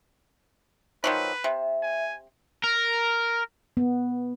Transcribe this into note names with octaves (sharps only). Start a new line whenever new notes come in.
D#3 F3 F#3 B4
C3 E5
G#5
A#4
B3